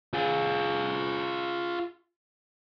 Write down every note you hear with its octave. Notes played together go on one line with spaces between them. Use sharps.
F4 G#4